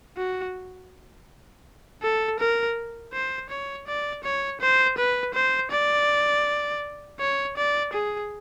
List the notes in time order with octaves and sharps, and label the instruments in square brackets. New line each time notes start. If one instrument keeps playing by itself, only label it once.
[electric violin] F#4
A4
A#4
C5
C#5
D5
C#5
C5
B4
C5
D5
C#5
D5
G#4